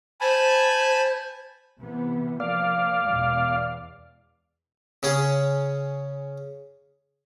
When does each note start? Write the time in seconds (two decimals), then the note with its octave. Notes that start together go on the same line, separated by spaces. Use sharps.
0.21 C5 G#5 A5 B5
1.80 C3 E3 B3
2.40 F3 A#3 D5 F5
3.06 E2 B2 G#3
5.03 C#3 C#4 G#4